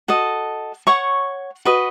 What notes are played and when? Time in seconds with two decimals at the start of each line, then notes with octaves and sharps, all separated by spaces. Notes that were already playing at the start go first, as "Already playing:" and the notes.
0.08 F#4 A4 D#5
0.87 C#5 F#5 C#6
1.65 F#4 B4 D#5